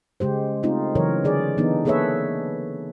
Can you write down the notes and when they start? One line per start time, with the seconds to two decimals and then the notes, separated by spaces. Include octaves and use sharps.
0.20 C#3 G#3 G4 C5
0.63 A3 C4 D#4 F4
0.95 C#3 E3 F#3 A#4 C#5
1.24 D3 G#4 D5
1.58 E3 B3 D4 D#4
1.85 A#3 G#4 A4 B4 C#5 E5